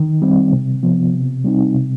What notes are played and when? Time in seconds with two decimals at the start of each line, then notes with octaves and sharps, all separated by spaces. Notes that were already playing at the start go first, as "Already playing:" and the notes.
Already playing: D#3
0.22 G3 C4
0.52 C3
0.83 F3 B3
1.13 C3
1.44 G3 C4 D#4
1.75 C3